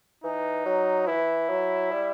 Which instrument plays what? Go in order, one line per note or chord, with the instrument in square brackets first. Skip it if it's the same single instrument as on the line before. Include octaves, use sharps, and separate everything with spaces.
[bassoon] E3 [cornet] D#4
[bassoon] F#3
[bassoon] E3 [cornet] E4
[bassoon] F#3
G3